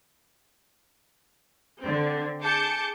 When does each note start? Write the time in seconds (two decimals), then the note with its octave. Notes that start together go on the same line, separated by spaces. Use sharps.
1.80 D3 C4
2.42 G#4 A5 D6 G6 C#7